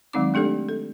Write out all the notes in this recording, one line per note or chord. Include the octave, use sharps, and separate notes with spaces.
D#3 F#3 G#3 C4 D#4 D6
A3 D4 G4 A4 D5
A4